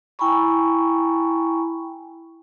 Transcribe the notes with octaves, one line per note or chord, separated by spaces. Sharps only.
E4 G5 G#5 A#5 B5 C#6